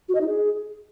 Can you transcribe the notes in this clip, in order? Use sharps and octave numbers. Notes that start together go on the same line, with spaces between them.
F#4
D#5
D#4
G#4